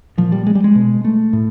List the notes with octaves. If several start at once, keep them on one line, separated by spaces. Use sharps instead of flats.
A#2 F3
G3
G#3
G3
G#3
B2
A3
A2